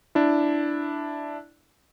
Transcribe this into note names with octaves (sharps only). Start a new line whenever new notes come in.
D4 E4